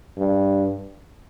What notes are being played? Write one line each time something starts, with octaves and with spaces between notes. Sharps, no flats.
G2